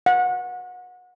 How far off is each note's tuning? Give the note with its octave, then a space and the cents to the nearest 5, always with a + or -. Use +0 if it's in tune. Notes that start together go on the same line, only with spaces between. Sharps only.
F#5 -30